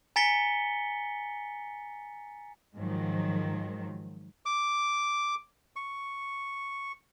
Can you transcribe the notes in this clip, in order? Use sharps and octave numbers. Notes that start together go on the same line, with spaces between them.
G#5 A#5 A6 B6 C#7 G7
G#2 D#3 F3 F#3
D6
C#6